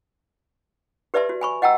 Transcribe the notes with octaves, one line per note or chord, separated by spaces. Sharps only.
G4 B4 D5 E5 A5 C6
F#4
G#5 B5 C#6
D#5 F#5 G5 A5 A#5 E6